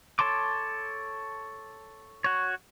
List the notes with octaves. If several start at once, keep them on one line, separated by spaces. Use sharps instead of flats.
A4 C#5 A5 C6 D6
F#4 C#5